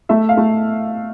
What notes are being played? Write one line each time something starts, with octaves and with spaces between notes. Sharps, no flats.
A3 E5
F5
A3